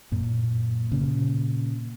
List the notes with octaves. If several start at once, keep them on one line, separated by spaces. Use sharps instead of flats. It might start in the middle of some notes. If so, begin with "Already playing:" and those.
F#2 A#2
A#2 C#3